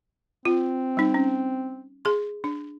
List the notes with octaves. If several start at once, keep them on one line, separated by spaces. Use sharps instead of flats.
C4 F4
G3 D#4
C#4
G#4 C6
D4